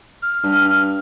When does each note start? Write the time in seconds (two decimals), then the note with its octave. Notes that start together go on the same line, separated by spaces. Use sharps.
0.22 F6
0.43 G2